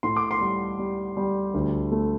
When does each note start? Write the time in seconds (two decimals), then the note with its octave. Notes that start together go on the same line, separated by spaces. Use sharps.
0.03 A2 C6
0.17 D6
0.31 C6
0.41 G3
0.79 G3
1.17 G3
1.54 D2
1.92 A3